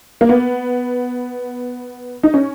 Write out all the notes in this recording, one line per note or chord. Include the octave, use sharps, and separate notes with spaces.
A#3
B3
D#4
C#4